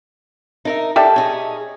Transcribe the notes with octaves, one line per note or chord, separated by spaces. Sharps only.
D#4 A#4 E5
G4 A4 D5 E5
C#4 D#4 G#4